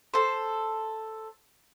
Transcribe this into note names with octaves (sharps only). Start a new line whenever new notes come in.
A4 C5